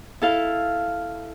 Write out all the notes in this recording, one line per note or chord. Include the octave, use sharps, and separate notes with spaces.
E4 A4 F5